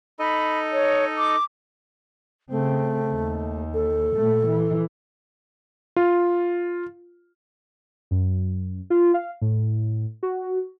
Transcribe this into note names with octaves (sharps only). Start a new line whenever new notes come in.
D#4 A4 D#5 B5
C#5
D6
C#3 A3 C4
D#2
A4
A#2 A3
E3
F4
F#2
F4
F5
A2
F#4